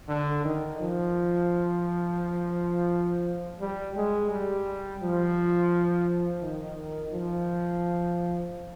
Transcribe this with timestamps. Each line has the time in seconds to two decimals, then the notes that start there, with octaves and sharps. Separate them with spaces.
0.09 D3
0.44 D#3
0.80 F3
3.61 G3
3.96 G#3
4.31 G3
5.02 F3
6.42 D#3
7.12 F3